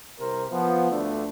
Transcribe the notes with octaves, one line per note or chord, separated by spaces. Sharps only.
C2 C3 A#4 C5
F3 B3
D2 D3 A3 D4